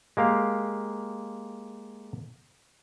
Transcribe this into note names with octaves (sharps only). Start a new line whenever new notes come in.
G#3 A#3 G4 F5